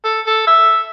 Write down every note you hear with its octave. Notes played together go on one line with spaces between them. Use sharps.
A4
A4
E5